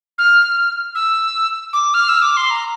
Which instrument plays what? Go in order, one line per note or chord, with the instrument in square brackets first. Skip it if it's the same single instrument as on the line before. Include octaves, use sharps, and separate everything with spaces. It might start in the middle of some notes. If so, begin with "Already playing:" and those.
[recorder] F6
E6
D6
F6
E6
D6
C6
A#5